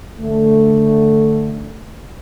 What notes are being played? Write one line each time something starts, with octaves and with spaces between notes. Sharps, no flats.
D3 A3